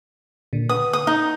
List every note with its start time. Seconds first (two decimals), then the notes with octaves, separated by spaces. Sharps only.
0.53 A#2 D3
0.69 B4 F#5 D#6
0.93 D#6
1.07 D#4